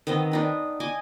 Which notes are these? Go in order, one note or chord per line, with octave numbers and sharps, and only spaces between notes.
D#3 B3 C4 D#5
D4 D#4 B4
D#5 G#5 D6